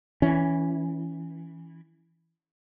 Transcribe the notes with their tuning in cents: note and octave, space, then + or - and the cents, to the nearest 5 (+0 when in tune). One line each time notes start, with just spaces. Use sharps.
E3 +0 C#4 +5